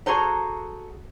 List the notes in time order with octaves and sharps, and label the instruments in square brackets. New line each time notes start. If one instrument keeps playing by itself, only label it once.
[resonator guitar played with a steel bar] F#4 G#4 A4 C5 A#5